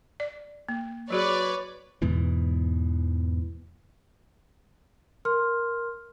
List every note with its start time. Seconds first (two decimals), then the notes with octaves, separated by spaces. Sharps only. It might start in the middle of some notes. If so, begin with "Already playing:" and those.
0.20 D5
0.69 A#3
1.10 F#3 F#4 G#4 B4 C#5 D5
2.02 E2 G#2 B2 E3
5.25 A#4 C6 F6